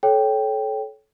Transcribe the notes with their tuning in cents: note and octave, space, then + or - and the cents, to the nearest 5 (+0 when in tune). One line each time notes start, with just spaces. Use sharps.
A4 -25 C#5 +0 G5 +0